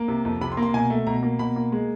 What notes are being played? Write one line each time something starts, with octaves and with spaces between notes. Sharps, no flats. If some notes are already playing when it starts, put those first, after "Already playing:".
Already playing: A#3
C3
F2
C3 B5
C6
A#3
C6
B2 G#5
A3
B2 A#5
A#3
B2 B5
A#3
G#3